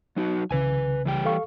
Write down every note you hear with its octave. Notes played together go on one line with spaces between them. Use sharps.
F#3 D#4 F#4
C2 C#3 B4 G#5
E3 G3 G5
A4 F5 C#6